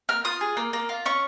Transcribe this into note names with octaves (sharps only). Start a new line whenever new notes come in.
A#3 F6
F4 D#6
G#4
A#3
A#3
F4
C#4 C#6